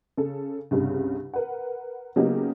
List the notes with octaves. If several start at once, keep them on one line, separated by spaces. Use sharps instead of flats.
C#3 A4
C2 G2 C#3 G3
A#4 B4 F#5
C#3 F#3 A#3 B3 D#4 G4